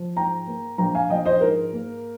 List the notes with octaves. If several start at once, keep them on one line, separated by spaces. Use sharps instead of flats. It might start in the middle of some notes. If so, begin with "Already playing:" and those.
Already playing: F3
G#2 G5 A#5
A#3
A#1 G5 A#5
F5 G#5
F3 D#5 G5
C5 D#5
G#2 A#4
A#3